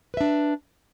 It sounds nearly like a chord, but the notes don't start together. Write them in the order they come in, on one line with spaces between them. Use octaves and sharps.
B4 E5 D4